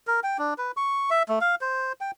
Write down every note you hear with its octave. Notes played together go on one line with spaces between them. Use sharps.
A#4
G5
D4
B4
C#6
E5
A3
F5
C5
G5